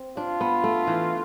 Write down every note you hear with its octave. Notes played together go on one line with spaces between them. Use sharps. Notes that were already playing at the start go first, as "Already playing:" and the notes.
Already playing: C4
D4 F4
B3
A3
E3